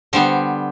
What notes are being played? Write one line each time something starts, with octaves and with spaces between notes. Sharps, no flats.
D3 G3 B3 C5